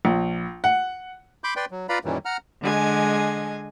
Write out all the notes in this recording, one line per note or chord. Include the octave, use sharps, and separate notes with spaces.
A#1
F#5
B5 C6 D6 G6
B4 D5 G5 C6
F#3
F4 B4 D5 F5 A#5 B5
F#2 A#2 D#3 E3 F#3 G3
F#5 A#5 F6
D3 G#3 D#5 G#5